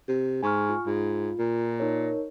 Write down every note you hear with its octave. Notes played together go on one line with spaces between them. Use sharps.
C3
G#2 G#5 C#6 F6
F4
G#2 F4
A#2
D#4 A#4 C#5